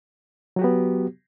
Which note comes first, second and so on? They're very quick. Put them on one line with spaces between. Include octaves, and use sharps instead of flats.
F#3 F#4 G4 B3